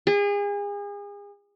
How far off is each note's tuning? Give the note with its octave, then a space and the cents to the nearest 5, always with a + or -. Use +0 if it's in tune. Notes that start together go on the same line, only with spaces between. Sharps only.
G#4 -35